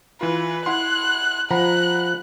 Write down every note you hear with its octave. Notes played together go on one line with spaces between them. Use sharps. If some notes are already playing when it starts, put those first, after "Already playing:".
E3 F4 B4
E4 F#5 C6 F#6
F3 F#5 A#5 B5 F#6